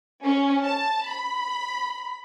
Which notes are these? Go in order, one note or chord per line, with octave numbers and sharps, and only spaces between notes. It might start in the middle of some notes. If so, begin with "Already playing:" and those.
C#4
A5
B5